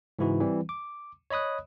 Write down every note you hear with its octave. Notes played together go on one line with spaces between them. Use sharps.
G#2 C#3 E3 E4 F#4
E3 G3 C4
D6
C#5 D#5 B5 D#6 F#6